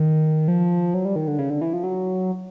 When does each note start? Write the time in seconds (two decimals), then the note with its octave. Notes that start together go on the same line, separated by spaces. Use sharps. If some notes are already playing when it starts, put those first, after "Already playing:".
Already playing: D#3
0.48 F3
0.94 F#3
1.05 G3
1.16 D#3
1.28 D3
1.39 C#3
1.50 D3
1.61 E3
1.73 F3
1.84 F#3